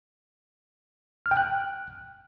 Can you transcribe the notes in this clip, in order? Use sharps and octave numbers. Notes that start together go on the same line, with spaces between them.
F6
G5
F#6